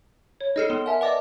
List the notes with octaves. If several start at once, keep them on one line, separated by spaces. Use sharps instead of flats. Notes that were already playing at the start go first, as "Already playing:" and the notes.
C#5
D#4 G#4 A4 D#5 F6 C7
B3 C6
A#4 E5 F#5 G#5 A5
B4 D5 D#5 F#5 A5 D6